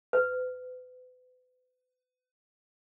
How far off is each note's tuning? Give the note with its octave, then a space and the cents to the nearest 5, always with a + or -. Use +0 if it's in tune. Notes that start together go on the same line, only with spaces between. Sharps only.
B4 +35